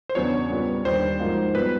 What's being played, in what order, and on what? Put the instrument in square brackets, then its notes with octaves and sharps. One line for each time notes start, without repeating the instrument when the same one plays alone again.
[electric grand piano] C5
[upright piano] E2 C#3 F#3 B3 D4 [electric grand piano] C#5
[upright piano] A#2 G3 B3
[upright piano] D#2 D3 G3 [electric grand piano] C5
[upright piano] G#2 F3 A#3 D#4 F#4
[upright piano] A#2 G3 B3 [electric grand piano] B4